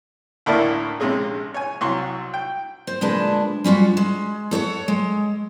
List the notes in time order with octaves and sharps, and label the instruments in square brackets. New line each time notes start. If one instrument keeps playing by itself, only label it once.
[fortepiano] D2 A2 A#3 E4 A#4 D5
A#1 C3 G#3 C#4 G#4
C#5 G#5
C2 F#3 C6 C#6
G5
[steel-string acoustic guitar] C5
D2 A#2 G#3 D4 B4 A5
G3 C#4 F4 F#4
G#3
A4 C#5 E5 F#5
G#3